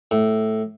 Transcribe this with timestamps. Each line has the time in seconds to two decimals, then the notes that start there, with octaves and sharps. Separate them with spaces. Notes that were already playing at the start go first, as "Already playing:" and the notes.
0.11 A2